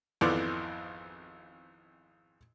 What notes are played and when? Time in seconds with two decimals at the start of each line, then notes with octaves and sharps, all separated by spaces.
0.21 G#1 F2 E3 B3 D5